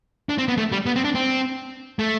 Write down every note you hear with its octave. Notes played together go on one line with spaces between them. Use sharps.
D4
C4
B3
A3
G3
B3
C4
D4
C4
A3